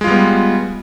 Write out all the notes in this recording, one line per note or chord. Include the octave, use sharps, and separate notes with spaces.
G3 G#3 B3 F4